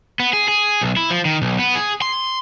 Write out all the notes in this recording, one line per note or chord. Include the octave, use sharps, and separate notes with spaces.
B3
G#4
G#4
B1
E4
F3
D#3
B1
B3
G#4
C6